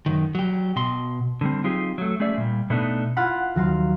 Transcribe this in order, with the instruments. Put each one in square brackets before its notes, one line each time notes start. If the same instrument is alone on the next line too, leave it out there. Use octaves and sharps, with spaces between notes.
[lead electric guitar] F#2 D#3
F#3 G4
B2 C6
[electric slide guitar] D3 G3 C4
F#3 C4 D#4 F4 G4 G#4
F#3 A3
G#3 A3 C#4 G#4 D5 E5
A#2 G3
B2 A3 B3 D4 D#4
[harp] E4 F4 F5 F#5 B5 C6
D#2 F#3 F#4 F5 C6